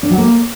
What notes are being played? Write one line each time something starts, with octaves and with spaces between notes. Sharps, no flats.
D4
F#3
A#3